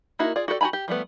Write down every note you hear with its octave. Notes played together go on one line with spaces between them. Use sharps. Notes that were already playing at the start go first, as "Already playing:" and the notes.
A#3 D#4 E4 F#4 A#4
F4 G#4 D5
F#4 G4 A4 A#4 D5
F#4 G4 G#5 A#5 B5
G4
F3 G3 A3 B3